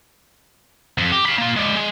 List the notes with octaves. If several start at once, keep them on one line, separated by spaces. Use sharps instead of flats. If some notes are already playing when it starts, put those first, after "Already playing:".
F2
G4
F5 B5
A#3 F4
G#3 D5
G#3